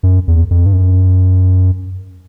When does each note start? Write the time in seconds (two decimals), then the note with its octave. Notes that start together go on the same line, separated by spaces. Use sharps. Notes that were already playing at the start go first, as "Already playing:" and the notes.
0.03 F#2
0.28 E2
0.51 F2
0.66 G2
0.73 F#2